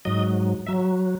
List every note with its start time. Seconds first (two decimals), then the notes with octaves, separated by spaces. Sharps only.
0.05 G#2 F#3 D#5
0.66 F#3 E5